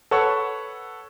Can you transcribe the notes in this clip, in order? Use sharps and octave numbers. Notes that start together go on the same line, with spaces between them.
A4 B4 C#5 F#5 C#6 E6